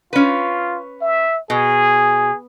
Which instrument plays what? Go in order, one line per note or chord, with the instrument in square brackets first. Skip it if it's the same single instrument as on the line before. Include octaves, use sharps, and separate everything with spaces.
[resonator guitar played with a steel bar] C#4 B4 [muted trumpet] F4
[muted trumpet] E5
[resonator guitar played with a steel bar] B2 [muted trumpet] G#4